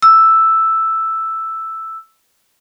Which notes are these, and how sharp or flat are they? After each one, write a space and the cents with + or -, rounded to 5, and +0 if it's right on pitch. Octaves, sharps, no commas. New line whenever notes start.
E6 +0